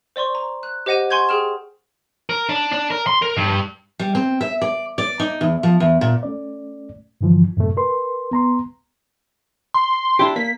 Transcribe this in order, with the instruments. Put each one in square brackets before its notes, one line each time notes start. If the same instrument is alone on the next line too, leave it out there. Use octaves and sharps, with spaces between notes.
[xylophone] C5 D5 C6 C#6
A#5
F#6
G4 C5 D#5 F#5 A#6 D#7
F#5 G#5 C6 C#6 G6 G#6
G#4 G5 F6 E7
[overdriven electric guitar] A#4
D4
D4
A#4
C6
A#4
G2
[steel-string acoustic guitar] G3
C4
E5
D5
D5
D#4
E2
F3
E2
A#2
[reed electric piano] A3 C#4 D5
G2 D3 E3 F3
F#2 A2 C3 A3
A#4 B4 C6
B3 A#5 C6
[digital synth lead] C6
[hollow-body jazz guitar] D4 E4 G4
[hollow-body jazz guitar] A#3 [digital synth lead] B6